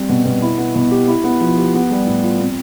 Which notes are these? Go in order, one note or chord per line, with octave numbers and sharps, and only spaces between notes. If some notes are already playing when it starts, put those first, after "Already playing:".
Already playing: G3 C4
B2
B2
E4
B3
B2
G4
E4
B3
F3
G4
B3
G3
A2
F4
C4